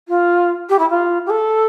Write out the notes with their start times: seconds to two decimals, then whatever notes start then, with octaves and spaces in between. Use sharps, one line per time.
0.09 F4
0.69 G4
0.79 E4
0.90 F4
1.26 G4
1.30 A4